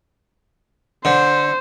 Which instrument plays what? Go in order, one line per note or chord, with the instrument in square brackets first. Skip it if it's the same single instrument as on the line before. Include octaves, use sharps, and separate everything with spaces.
[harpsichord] D3 [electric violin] C5